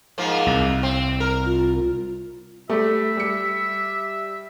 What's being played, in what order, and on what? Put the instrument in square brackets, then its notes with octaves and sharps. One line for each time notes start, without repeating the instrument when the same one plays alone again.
[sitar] G#2 F3 A#3
[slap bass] C2
[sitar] C4
A#4
[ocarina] F4
[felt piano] G3 A3 [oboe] E5
[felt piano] G3 C#7